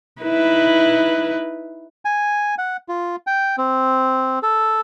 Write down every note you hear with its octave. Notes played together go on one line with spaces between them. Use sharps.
D#4 E4 B4
G#5
F#5
F4
G5
C4
A4